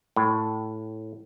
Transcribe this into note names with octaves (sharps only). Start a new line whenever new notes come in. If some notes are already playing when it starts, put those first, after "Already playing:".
A2